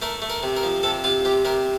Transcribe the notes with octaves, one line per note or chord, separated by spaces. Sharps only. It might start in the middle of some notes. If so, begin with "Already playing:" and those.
A3 A#4
A3
A#4
C3
A#4
F3
C3 A4
C3 F4
C3 G4
C3 A#4